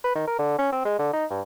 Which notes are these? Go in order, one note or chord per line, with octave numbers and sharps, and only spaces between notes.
B4
D#3
A#4
D3
C#4
C4
G#3
D3
D#4
G2